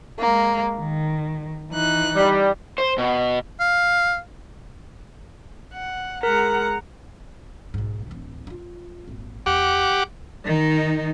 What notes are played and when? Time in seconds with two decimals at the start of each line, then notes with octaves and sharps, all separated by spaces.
0.20 G#3 A#3
0.78 D#3
1.71 E3 D#4 F#6
2.16 G3
2.78 C5
2.98 B2
3.60 F5
5.73 F#5
6.23 G#3 A#4 F#5 A#5
7.74 B1 G#2
8.07 D1 E3
8.47 D#4 F4
9.08 G#1 A#2
9.46 E2 G4 F#5 D6
10.44 D#3 D#4